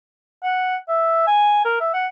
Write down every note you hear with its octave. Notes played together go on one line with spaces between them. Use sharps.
F#5
E5
G#5
A#4
E5
F#5